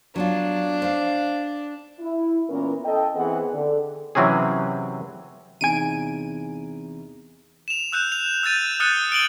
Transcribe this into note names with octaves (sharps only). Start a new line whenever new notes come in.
F#3 B3 D4 F4
C5 F5
E4
A#2 E3 B3 C#4 E4 A#4
A4 D#5 G5
E3 B3 C4 G#4 C5 F#5
D3
C3 E3 F#3 C4 C#4 G#4
E2 C3 D#4 G#5 D7 D#7
E7 F7
E6 F#6 G6 E7
F7
E6 G6 A6 D#7
D#6 F6 F#6 A6 C#7 D#7
D7 D#7 F#7 G7